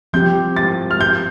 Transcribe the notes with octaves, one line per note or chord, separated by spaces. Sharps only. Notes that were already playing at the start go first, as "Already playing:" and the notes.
F3 C4 G4 G6
A6
F6
G6